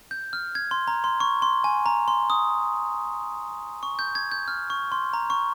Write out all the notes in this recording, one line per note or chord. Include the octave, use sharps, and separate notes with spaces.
G6
F6
G#6
C6
A#5
C6
C#6
C6
G#5
A#5
C6
D#6
C#6
G6
G#6
G6
F6
C#6
C6
A#5
C#6